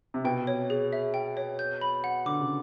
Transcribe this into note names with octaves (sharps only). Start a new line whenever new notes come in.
C3
B2 G5
C#5
G#4
E5
G5
C#5
G6
B5
F#5
D3 D6
C#3